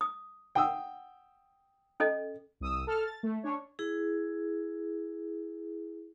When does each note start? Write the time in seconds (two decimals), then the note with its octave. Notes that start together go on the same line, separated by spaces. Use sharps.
0.01 D#6
0.55 F#5 G5 D#6 E6
2.00 C#4 A4 D#5
2.60 C2 D#6 E6
2.87 A4 A5 F6
3.04 A6
3.23 A3
3.43 C#4 D4 C#5
3.79 E4 G#4